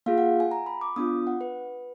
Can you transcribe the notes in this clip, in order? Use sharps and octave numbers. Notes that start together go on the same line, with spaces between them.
A#3 F4 G#4 F5
F#5
G#5
A#5
B5
D6
B3 D4 F4 D#6
F#5
B4